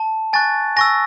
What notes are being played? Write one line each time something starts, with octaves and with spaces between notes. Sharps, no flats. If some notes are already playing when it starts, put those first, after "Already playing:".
Already playing: A5
G#5 C#6 F#6 A6
G#5 C#6 E6 A#6